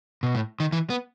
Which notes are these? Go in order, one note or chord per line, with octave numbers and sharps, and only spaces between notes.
B2
A2
D#3
E3
B3